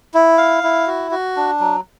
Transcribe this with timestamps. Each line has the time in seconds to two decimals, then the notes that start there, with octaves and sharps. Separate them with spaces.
0.14 E4
0.38 F5
0.63 E4
0.87 F#4
1.11 F#4
1.36 D4
1.60 F#3